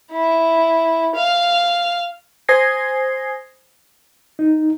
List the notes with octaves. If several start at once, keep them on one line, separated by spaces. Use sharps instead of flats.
E4
F5
C5 G#5 D#6 G#6 A#6 C7
D#4